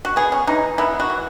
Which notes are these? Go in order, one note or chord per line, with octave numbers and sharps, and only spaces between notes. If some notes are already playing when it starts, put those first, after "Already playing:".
F#4
B3 G#4
C#4
E3 D#4
B3 E4
F#4
E3